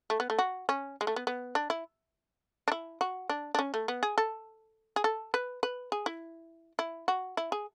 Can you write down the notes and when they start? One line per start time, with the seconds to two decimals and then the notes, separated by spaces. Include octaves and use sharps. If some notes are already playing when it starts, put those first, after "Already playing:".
0.10 A3
0.20 B3
0.30 A3
0.39 F#4
0.69 C#4
1.01 G#3
1.07 A3
1.16 B3
1.27 B3
1.55 D4
1.70 E4
2.68 D4
2.72 E4
3.01 F#4
3.29 D4
3.55 D4
3.59 C#4
3.74 A3
3.88 B3
4.03 G#4
4.18 A4
4.96 G#4
5.04 A4
5.34 B4
5.63 B4
5.92 G#4
6.06 E4
6.79 E4
7.08 F#4
7.37 E4
7.52 G#4